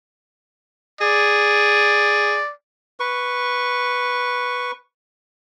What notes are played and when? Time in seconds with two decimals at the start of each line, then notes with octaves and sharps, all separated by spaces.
1.01 G#4 D5
3.00 B4 C#6